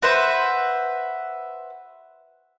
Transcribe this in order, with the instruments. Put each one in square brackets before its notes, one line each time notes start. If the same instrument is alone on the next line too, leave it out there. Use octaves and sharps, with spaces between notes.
[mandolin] F#4 B4 C5 E5